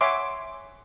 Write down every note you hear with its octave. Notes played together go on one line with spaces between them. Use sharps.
C#5 E5 F#5 G#5 C6 D6